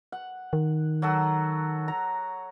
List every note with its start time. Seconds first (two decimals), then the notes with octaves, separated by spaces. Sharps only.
0.12 F#5
0.53 D#3
1.02 F#3 F#4 A4
1.88 A#5